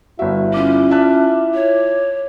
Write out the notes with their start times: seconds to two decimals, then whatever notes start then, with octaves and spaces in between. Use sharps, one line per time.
0.19 G1 E4 F#4 E5
0.54 C#4 F4 D6
0.91 E5 A5 F#6
1.54 C#5